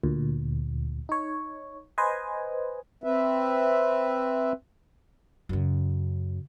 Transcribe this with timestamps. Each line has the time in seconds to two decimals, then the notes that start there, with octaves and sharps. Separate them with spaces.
0.03 D2 A#2
1.09 D#4 C#5
1.98 B4 C5 D#5 G#5
3.04 C4 B4 E5
5.49 F#2 C#3